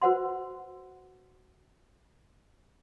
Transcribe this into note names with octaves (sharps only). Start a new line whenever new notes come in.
F#4 B4 C5 F#5 C6